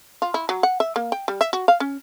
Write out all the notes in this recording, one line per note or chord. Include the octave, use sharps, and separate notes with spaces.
F4
E4
F#3
F#5
E5
A#3
G5
G3
E5
F#4
F5
C#4